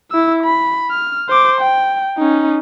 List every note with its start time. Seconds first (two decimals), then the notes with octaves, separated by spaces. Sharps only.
0.11 E4 E6
0.44 B5
0.91 F6
1.29 C5 D6
1.61 G5
2.18 C#4 D#4